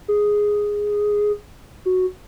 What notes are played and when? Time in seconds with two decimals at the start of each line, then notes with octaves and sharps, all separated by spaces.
0.08 G#4
1.86 F#4